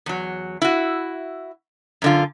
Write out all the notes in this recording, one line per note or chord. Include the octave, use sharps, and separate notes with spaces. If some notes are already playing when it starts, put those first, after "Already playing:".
E2 F#3
E4 F#4
F#2 D3 F4